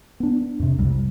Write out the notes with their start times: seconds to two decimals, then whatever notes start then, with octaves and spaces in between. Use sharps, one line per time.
0.20 B3 D4
0.60 F2 C3
0.78 C2 C3 G3